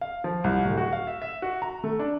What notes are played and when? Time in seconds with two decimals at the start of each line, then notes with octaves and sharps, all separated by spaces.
0.01 F5
0.24 F3
0.44 C2
0.65 D1
0.77 F#4
0.93 F5
1.07 E5
1.22 E5
1.42 F#4
1.62 A#5
1.84 A3
1.99 D4